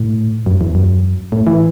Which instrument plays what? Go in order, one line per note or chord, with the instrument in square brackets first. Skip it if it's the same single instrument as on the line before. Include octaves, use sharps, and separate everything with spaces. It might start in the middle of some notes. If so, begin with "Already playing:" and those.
Already playing: [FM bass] A2
F#2
E2
F#2
A2
E3